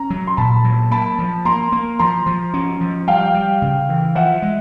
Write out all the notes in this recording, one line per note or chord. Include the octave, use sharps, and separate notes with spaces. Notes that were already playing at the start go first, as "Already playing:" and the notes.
Already playing: C#4 A#5
F#3
C6
A#2 A5 B5
F#3
A#3 A5 B5
F3
A#3 A#5 C6
A#3
F3 A#5 C6
F3
C#4
F3
G3 F5 G5
G3
C#3
E3
F3 E5 F#5
G#3